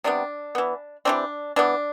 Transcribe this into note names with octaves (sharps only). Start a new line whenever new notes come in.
C3 G3 B3 D4
E3 B3
E3 G3 C4 D4
E3 B3 D4